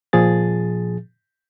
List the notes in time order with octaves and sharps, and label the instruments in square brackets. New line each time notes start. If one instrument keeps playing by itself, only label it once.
[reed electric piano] A#2 F3 G#4 A6